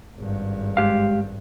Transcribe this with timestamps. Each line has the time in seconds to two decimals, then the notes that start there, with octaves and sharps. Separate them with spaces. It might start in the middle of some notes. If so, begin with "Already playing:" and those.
0.16 G#1 G2
0.77 G#3 G4 F5